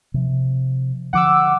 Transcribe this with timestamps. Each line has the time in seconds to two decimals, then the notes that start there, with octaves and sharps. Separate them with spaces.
0.14 C3 F3
1.13 D3 F3 F#5 D6 E6